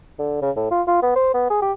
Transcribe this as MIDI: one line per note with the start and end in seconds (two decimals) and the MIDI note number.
0.19 0.38 50
0.42 0.51 49
0.56 0.70 45
0.71 0.82 65
0.87 1.02 65
1.02 1.11 59
1.15 1.34 72
1.34 1.50 59
1.50 1.62 68
1.62 1.72 67